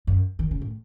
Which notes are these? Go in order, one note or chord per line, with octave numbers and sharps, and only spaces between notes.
F#2
D#3
C#3
A2